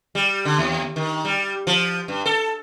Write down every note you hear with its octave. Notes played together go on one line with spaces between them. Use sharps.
G3
D3
D#2
D#3
G3
F3
G2
A4